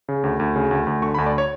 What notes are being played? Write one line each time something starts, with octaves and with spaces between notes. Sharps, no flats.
C#3
D2
D2
C#3
D2
D2
D3 C#6
B5
D2
D5
C#5